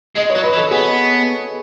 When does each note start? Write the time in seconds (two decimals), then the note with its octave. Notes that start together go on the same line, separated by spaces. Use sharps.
0.16 G#3 D#5
0.30 C#5
0.35 F#3
0.43 B4
0.53 E3
0.57 A4
0.71 B3 G#4